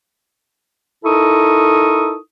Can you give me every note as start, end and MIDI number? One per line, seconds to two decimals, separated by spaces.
1.05 2.17 63
1.05 2.17 64
1.05 2.17 69
1.05 2.17 70
1.05 2.17 85
1.05 2.17 87